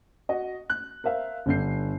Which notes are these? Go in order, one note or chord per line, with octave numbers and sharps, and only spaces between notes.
F#4 D#5
F#6
A#4 C5 E5 F5
G1 D3 G6 C7